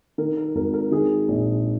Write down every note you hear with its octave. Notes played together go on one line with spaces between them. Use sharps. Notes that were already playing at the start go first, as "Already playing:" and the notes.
D#3 A#4
A#4
G#1 A#4
A#4
D#3 G#4
A#1